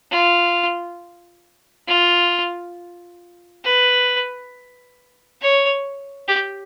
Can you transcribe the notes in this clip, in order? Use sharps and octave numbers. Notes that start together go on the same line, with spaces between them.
F4
F4
B4
C#5
G4